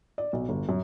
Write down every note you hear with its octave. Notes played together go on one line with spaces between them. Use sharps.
D5
B1
G1
F#2